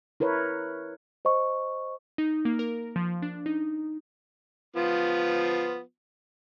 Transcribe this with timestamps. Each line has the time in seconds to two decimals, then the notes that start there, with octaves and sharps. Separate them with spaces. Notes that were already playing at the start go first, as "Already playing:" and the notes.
0.20 E4 A#4 B4 C#5
1.25 C5 D#5 C#6
2.18 D#4
2.45 A#3
2.59 A#4
2.96 F3
3.22 D4
3.46 D#4
4.76 F3 B3 F4